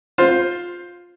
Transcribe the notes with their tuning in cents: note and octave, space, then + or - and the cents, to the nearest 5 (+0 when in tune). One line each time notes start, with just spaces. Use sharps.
F4 +10 C5 +0